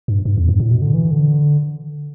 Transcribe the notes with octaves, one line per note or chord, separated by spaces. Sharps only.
G2
G2
E2
G2
A2
B2
D3
E3
D3